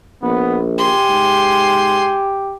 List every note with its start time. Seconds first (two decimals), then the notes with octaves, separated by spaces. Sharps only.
0.22 A#1 B3
0.78 G4 G#5 C6
1.09 G#2